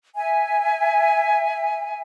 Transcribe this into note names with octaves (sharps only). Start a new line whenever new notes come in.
E5 G#5